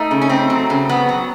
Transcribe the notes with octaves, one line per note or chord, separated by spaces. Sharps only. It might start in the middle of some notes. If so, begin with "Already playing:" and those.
Already playing: A3 D#4
C#3
C#4
A3 C4
F#3
C#3
B3
F#3